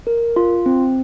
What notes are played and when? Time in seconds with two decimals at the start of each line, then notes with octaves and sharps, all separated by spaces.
0.07 A#4
0.36 F4
0.66 C4